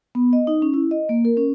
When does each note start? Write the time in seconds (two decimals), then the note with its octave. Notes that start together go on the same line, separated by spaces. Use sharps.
0.15 B3
0.33 D#5
0.47 D#4
0.62 C#4
0.74 E4
0.91 D#5
1.09 A#3
1.25 A#4
1.37 C#4